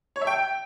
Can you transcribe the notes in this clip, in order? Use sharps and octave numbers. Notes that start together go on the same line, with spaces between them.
C#5
E5
G5